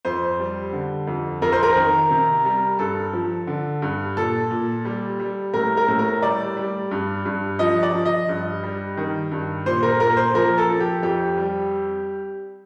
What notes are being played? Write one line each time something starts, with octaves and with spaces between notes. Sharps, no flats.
F2 C5
G3
D3
F2
F2 A#4
C5
A#4
D#3
C3
G3
G2 A4
F3
D3
G2
A#2 A4
A#2
G3
G3
A2 A#4
A#4
A2
A#4
G3 D5
G3
G2
G2
F3 D#5
D5
F3
D#5
G2
G3
D#3
G2
A#2 C5
A#4
A#2 A#4
C5
F3 A#4
A4
F3
G4
F2 G4
G3